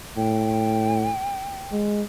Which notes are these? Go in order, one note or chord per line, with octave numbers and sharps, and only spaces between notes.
A2 G5
G#3